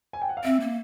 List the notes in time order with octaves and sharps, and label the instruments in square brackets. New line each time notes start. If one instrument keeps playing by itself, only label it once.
[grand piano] G#5
G5
F#5
F5
[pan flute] C4 [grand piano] E5
[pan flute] A#3